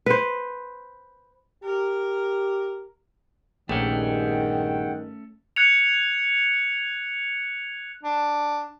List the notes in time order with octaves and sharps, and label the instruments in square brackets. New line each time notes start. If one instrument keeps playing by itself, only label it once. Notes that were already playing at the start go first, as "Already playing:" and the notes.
[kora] B4 C5
[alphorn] G4 [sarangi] A#4
[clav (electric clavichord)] A#1 [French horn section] G2 D#3 [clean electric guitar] A3 C#4 [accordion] G#4 F#5 G5
[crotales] F#6 G#6 C#7 F7
[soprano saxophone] D4